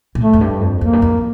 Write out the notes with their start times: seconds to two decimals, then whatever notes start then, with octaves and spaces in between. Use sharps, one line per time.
0.15 A#2
0.20 A2 A3
0.33 F2
0.41 G2
0.61 F2
0.81 F2 A#3
0.93 G2
1.02 F2